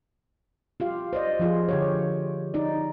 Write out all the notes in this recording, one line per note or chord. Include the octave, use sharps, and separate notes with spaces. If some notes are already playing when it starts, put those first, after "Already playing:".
F4 G4 F5
C5 D5 D#5
F3 F4 G#4
D3 G4 C#5
D#4 D5